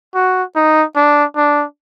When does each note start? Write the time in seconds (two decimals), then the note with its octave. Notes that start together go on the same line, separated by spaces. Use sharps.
0.15 F#4
0.56 D#4
0.96 D4
1.36 D4